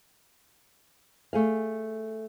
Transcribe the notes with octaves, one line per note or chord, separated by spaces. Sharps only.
A3 G#4 F5